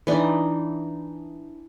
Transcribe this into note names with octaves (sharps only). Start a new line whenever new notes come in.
E3 D4 D#4